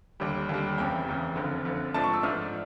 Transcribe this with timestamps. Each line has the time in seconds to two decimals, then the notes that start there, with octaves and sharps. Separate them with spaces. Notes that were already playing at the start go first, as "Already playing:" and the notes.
0.20 D#2 D3 G3
0.49 D#2 D3 G3
0.78 F1 E2 C#3 G5
1.07 F1 E2 C#3
1.36 F#1 F2 D3
1.65 F#1 F2 D3
1.94 G#2 F3 A3 D4 A5
2.04 C#6
2.14 E6
2.23 G#2 F3 A3 D4 F6